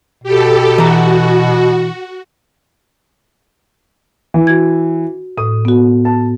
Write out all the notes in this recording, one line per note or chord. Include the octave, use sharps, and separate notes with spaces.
B2 G4 A4
E3 F#4 A#5
E3
F#4 G#6
A2 D#6
B3 F#4
A5